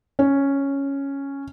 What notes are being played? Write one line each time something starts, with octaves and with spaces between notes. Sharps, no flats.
C#4